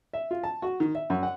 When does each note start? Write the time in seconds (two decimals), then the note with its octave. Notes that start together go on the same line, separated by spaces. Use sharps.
0.13 E5
0.31 F4
0.43 A5
0.62 F#4
0.80 D#3
0.95 E5
1.10 F#2
1.23 F#5